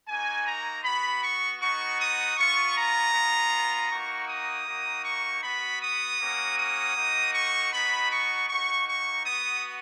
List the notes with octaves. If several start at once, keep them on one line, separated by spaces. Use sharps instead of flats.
A#3 D#4 F#4 G#5
A#5
B3 F#4 B5
C#6
B3 D#4 F#4 C#6
D#6
B3 F4 C#6
A#5
B3 F4
A#3 D#4 F#4 C#6
D#6
A#3 D#4 F#4
C#6
B3 F#4 B5
D#6
A#3 C#4 F#4
D#6
A#3 D#4 F#4
C#6
B3 D#4 F#4 B5
C#6
A#3 D#4 F#4 C#6
C#6
B3 F#4 D#6